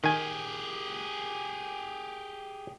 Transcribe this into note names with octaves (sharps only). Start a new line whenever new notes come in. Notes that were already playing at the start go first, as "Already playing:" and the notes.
D#3 G4 G#4 G#5